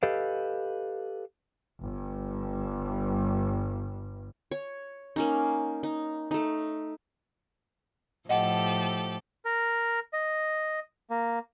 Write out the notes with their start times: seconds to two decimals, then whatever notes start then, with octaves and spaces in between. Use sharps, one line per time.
0.03 G4 A4 B4 D#5 F5
1.80 G1 G2
4.51 C#5
5.16 A#3 C#4 D#4
5.83 D#4
6.31 A3 D#4
8.29 A2 F3 G4 A4 D#5 F#5
9.45 A#4
10.13 D#5
11.10 A#3